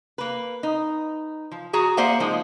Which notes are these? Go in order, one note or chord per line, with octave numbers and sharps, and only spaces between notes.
A#3 B4
D#4
F3
F#4 G#4 A#5
A#3 G#4 C5 D5 E5 F#5
F3 G#3 A#3 D#4